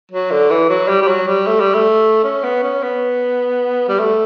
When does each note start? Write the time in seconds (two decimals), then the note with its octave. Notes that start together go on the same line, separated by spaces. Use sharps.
0.12 F#3
0.31 D3
0.50 E3
0.70 F#3
0.88 G3
1.02 G3
1.08 F#3
1.27 G3
1.46 A3
1.60 G3
1.74 A3
2.24 C#4
2.44 B3
2.63 C#4
2.83 B3
3.88 G3
3.99 A3